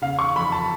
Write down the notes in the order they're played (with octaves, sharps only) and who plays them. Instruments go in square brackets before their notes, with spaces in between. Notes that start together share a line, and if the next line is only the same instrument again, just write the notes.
[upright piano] C#3 F5
C#6
F2 B5
A5